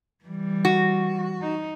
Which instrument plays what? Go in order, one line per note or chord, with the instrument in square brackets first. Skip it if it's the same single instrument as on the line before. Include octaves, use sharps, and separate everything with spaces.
[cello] E3 G3
[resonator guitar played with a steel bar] F#4
[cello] D#4